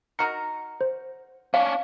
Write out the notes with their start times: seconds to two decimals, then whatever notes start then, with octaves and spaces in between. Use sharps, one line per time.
0.19 D#4 F#4 A#4 C#7
0.81 C5
1.54 C#4 D4 F5